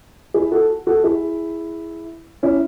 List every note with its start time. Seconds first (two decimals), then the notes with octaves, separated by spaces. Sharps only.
0.34 E4 G#4
0.52 F#4 A4
0.87 F#4 A4
1.04 E4 G#4
2.43 C#4 E4